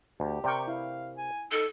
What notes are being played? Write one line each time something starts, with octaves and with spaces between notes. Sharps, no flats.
D2 G4
C3 A#4 D5 G5 C#6
E4 F5
G#5
D#4 A4